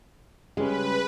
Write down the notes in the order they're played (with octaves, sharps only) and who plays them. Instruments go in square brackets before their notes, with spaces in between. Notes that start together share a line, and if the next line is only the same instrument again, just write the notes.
[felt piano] C#3 G3 C#4 [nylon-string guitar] G#3 [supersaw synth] B4